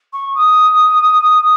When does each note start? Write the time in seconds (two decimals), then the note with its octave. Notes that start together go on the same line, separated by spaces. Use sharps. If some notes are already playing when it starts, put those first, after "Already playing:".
0.13 C#6
0.35 D#6